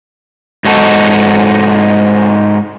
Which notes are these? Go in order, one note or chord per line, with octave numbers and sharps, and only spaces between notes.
G#2 D#4 F#4 A4